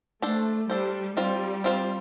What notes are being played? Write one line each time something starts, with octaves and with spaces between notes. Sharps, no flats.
A3 D4 A4 C5
G3 D4 A4 C5
G3 C4 F4 C5
C4 F4 C5